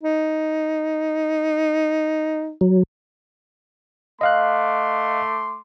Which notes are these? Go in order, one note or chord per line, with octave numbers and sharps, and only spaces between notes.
D#4
F#3
A3 D#5 F5 C6 D6 F#6